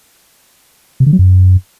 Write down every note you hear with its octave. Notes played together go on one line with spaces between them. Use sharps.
C3
D3
F#3
F#2